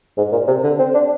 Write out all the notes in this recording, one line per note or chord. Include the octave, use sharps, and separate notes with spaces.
G#2
A#2
C3
D3
C4
D4